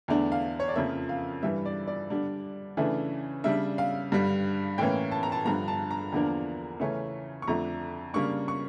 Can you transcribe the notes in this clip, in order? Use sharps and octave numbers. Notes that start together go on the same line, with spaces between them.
E2 D3 A3 D4
F5
C#5
D5
F2 C#3 F3 A#3 E5
F5
G2 E3 G3 E5
D5
D5
D3 G3 D4
C#3 E3 A3 D4
C#3 G3 D4 E5
F5
G2 D3 G3
A2 E3 A#3 C#4 G5
A5
A#5
A5
G2 D3 F3 A#5
A5
A#5
E2 D3 F3 A#3 D4
C#3 E3 A3 C#4
C#6
F2 D3 A3 D4 A#5
C#3 G3 A#3 D4 C#6
C#6